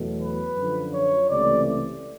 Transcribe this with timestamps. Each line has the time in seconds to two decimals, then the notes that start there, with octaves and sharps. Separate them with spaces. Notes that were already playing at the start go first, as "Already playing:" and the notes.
Already playing: E2 B2 F#3 A3
0.20 B4
0.56 F#2 D3 F3
0.93 C#5
1.30 C#2 C3 E3 A3 D5